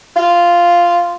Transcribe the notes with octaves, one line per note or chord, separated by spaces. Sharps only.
F4